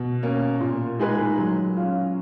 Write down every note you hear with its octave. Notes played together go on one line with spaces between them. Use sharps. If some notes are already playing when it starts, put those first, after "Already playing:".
Already playing: B2
A#3 C#4
A#2
G#3 D#4 G#4 B4
F#3
C#4 F4